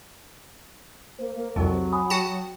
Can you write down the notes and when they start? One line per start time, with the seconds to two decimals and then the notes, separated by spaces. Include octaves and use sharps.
1.19 A#3 C5
1.36 A#3
1.56 C2 F2 F#3
1.92 G#5 B5 D#6
2.10 F#4 G5 A5